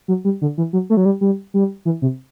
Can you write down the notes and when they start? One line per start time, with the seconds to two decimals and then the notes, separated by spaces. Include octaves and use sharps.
0.08 F#3
0.25 G3
0.42 D3
0.58 E3
0.73 F#3
0.90 A3
0.97 F#3
1.05 G3
1.21 G3
1.54 G3
1.85 E3
2.02 C3